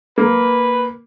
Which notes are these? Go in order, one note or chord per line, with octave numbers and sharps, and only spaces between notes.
A#3 B4